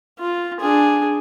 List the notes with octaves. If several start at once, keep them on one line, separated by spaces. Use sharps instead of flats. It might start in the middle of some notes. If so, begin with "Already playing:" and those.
F4
D4 G#4